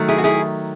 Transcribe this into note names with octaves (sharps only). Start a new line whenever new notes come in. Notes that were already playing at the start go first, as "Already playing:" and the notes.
Already playing: D#3 F#3 A3
E4 G#4
F#4
E4 G#4